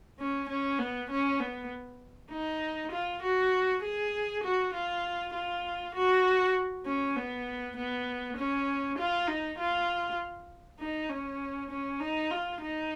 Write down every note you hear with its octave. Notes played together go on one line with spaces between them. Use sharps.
C#4
C#4
B3
C#4
B3
D#4
F4
F#4
G#4
F#4
F4
F4
F#4
C#4
B3
B3
C#4
F4
D#4
F4
D#4
C#4
C#4
D#4
F4
D#4